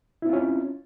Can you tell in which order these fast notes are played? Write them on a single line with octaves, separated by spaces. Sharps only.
E4 C4 F4 C#4